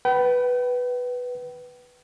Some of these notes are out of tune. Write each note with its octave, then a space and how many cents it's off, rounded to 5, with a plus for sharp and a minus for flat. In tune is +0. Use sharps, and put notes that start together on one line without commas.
B4 +0 G5 -40